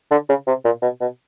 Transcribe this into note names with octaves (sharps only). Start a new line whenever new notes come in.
D3
C#3
C3
A#2
B2
B2